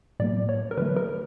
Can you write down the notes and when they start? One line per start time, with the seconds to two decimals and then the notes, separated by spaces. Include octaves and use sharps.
0.20 A2 F#3 A#3 D5
0.49 C#5
0.71 A#4
0.77 D3 F#3 A3 B4
0.97 A#4